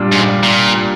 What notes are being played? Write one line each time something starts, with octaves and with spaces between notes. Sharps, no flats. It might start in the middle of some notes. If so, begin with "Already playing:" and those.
Already playing: A#2 G3 D4
G#2
A#2